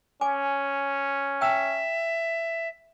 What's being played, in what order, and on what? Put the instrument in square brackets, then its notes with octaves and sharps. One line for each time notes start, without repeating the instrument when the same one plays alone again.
[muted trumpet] C#4 [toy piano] G#5 D6
[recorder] E5 [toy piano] G5 A5 E6